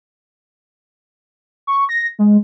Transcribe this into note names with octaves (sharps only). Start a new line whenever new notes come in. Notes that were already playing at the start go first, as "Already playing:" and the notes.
C#6
A#6
G#3